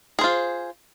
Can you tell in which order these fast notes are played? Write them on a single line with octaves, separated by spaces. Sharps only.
G#4 C5 F4